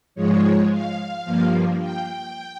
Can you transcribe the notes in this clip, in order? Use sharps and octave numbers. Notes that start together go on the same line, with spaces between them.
G#2 F3 G#3 C#5
F5
G2 F3 A#3
G5